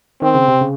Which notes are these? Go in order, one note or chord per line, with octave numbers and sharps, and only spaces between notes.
D#3 C4
C#3
C3
C#3